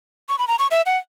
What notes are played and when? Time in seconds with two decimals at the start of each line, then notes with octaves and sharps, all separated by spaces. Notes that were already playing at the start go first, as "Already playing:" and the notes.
0.29 C#6
0.39 B5
0.48 A#5
0.59 C#6
0.71 E5
0.86 F#5